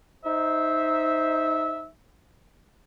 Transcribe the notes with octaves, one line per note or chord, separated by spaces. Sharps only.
D#4 C5 E5